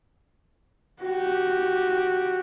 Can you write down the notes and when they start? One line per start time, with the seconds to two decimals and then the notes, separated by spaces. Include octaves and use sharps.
1.02 F#4 G4